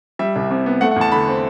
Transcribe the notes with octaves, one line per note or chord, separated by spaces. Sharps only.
G3 E5
C2
C3
B3
A3 F#5
F#5
E2
A5
D3 B5
C4